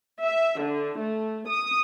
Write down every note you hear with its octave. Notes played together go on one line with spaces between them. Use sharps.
E5
D3
A3
D#6